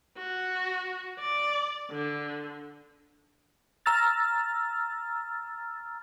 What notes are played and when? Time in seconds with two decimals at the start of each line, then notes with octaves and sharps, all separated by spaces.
0.18 F#4
1.20 D5
1.91 D3
3.86 A#5 E6 F6 A6